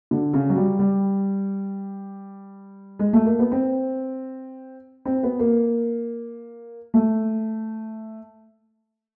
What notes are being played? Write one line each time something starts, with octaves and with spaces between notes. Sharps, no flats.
D3
C#3
F#3
G3
G3
G#3
A3
A#3
B3
C4
C4
B3
A#3
A3